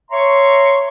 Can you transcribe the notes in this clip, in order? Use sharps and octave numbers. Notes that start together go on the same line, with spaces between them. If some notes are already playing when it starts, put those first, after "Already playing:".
C#5 E5 A#5 C6 C#6